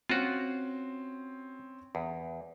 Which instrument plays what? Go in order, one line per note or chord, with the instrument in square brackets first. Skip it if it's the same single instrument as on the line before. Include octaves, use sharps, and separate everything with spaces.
[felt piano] C4 C#4 [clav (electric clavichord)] F4 F#4
[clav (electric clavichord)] E2